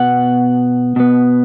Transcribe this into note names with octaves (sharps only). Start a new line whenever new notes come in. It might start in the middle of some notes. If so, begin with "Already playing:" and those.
Already playing: B2 B3 F#5
B2 B3